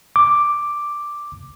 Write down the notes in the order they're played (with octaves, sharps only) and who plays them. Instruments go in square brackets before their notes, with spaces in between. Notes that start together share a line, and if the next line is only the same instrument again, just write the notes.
[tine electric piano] D6